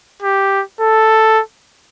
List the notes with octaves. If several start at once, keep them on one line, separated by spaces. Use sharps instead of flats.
G4
A4